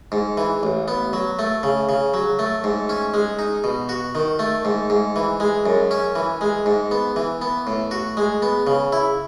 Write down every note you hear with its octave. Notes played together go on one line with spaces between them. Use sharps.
G#2
E3
A1
B3
F#3
A3
C#3
C#3
F#3
A3
G#2
C#4
G#3
D#4
B2
F#4
D#3
A3
G#2
G#2
E3
G#3
F#2
C#4
E3
G#3
G#2
B3
E3
B3
A2
F#4
G#3
B3
C#3
E4